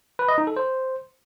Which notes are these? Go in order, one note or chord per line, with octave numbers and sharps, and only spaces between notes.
B4
D#5
D#4
A4
C5